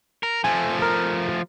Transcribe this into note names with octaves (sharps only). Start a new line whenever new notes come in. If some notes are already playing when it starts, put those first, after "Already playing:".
A#4
F3 A3 G#5
A#4